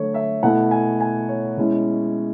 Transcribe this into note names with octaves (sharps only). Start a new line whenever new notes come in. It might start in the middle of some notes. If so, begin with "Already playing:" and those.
Already playing: D3 F#3 A3 C#5
E5
B2 A3 E4 F#5
G#5
G#5
C#5
B2 G#3 C#4 E4